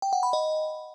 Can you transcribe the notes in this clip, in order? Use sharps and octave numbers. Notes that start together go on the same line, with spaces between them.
G5
F#5
B5
D#5